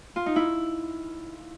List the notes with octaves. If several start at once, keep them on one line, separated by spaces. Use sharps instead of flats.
F4
D#4
E4